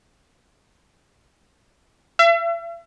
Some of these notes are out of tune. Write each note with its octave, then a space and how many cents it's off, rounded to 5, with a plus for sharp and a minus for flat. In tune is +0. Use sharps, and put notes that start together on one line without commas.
E5 +40